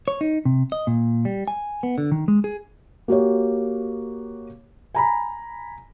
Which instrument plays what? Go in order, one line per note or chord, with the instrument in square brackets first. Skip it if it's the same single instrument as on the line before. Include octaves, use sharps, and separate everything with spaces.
[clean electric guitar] C#5
D#4
C3
D#5
A#2
G3
G#5
B3
D3
D#3
G#3
G#4
[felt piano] A#3 F#4 G4 C#5
G#5 A#5 B5